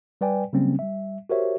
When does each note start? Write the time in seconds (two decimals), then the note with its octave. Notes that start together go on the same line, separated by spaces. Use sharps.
0.21 G3 B4 D5 G5 G#5
0.53 C#3 F#3 G3 A#3 C4 C#4
0.79 G3 E5
1.30 F#4 G4 A#4 C5 C#5 E5